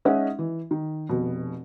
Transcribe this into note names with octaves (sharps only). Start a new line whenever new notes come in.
G#3 C#4 D#4 D#5 E5 F#5
E3
D#3
F1 B2